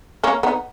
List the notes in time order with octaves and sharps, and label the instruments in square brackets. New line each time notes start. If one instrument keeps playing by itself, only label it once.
[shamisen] A#3 C#4
B3 D#4